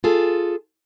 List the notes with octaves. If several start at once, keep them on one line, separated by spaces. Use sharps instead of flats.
F4 G#4 A4